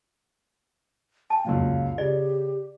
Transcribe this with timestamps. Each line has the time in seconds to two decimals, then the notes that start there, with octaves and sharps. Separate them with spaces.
1.30 G5 A5
1.45 C#2 F#2 A#2 F5
1.98 C#3 G4 D5